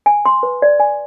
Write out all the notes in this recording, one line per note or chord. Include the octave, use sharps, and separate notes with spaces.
G#5
C6
B4
D5
G#5